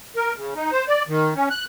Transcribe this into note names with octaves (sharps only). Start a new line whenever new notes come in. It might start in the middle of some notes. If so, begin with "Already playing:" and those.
A#4
C#3
D#4
C5
D5
D#3
C#4
F#6